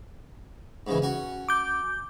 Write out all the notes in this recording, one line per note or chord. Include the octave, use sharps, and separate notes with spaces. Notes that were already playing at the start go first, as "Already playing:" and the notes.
G#2 C#3 E3
C#4 F#4
D6 G6